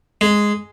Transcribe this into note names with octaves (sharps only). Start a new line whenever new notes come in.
G#3